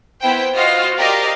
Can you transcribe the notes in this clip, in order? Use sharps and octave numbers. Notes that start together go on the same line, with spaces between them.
B3 E4 C5 G5
F4 F#4 C5 D#5 F5
G4 A#4 D5 D#5 F5